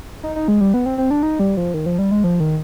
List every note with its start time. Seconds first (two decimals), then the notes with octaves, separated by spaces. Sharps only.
0.23 D#4
0.36 D#4
0.48 G#3
0.61 G3
0.74 B3
0.86 C4
0.98 C4
1.11 D4
1.23 D#4
1.39 G3
1.57 F3
1.74 D#3
1.86 F3
1.99 G3
2.11 G#3
2.24 F3
2.40 D#3